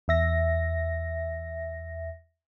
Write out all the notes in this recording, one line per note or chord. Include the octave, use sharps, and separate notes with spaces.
E2 E5 A#6